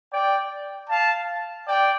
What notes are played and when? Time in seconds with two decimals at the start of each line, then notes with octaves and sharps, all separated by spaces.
0.11 D5 G5
0.88 F5 A5
1.65 D5 G5